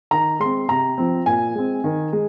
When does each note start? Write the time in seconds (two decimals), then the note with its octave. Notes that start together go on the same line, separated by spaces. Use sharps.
0.11 D#3 A#5
0.40 G#3 C4 C6
0.69 C3 A#5
0.98 F3 C4
1.26 A#2 G#5
1.55 G#3 C4
1.84 D#3
2.13 G#3